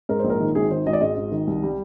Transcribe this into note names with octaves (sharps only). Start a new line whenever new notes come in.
G#2 A#4
C5
A#1
A#4
D#3
G#1 G#4
D#3 C5
G#1 D#5
D5
G#2 D#5
G#1
D#3
C2
G3